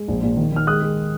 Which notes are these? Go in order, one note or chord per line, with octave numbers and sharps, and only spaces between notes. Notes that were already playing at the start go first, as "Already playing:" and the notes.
Already playing: G#3
A#1
A#2
D#3
D#3 F6
G#3 D#6 F#6
G#3